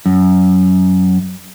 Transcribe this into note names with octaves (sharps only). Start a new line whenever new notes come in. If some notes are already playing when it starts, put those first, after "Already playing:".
F#2